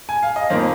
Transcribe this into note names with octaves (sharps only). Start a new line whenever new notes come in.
G#5
F5
D#5
F2 D#3 A#3 C5